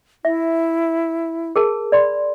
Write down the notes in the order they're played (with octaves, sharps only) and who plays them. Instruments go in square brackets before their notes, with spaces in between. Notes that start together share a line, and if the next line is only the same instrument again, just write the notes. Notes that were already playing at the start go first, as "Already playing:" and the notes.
[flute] E4 [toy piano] E5
[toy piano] G#4 A#4 A5
D5 B5 C6